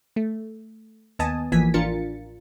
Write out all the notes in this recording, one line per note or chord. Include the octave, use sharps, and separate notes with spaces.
A3
D#2 B3 D#5 G#5 A5 D#6
A1 E3 F3 A#3 G#5 B6
A1 D4 F4 A#4 A6 C#7